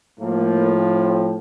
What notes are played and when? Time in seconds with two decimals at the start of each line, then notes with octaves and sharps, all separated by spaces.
0.17 A2 F3 A#3
0.73 C4